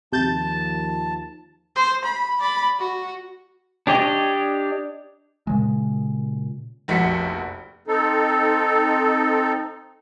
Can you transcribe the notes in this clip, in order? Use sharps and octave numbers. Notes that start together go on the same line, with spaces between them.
D#2 C3 F3 A5 G6 A6
C5
B5
D5 B5
F#4
D4 G4 C#5 D#5
A#2 C#3 G#3
F1 A#1 F#4 B6 C#7
C4 D#4 A4